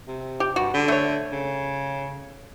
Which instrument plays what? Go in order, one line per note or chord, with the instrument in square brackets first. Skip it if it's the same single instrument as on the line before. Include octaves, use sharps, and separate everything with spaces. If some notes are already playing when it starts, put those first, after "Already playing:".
[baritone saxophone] C3
[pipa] G4
[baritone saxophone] G2 [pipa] F#4
[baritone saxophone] D3
[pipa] A3 C#5
[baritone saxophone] C#3